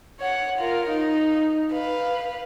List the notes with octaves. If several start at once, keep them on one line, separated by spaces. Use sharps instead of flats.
C#5 F#5
F4 A#4
D#4
B4 F5